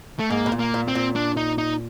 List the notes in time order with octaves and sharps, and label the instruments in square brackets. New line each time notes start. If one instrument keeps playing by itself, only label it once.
[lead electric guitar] A3
[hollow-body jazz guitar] G#2 [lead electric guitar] A#3
[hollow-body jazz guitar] B2
A#2
[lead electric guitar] A#3
[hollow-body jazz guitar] A#2
[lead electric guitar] C4
[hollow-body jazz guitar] A#2
[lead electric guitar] D4
D#4
D#4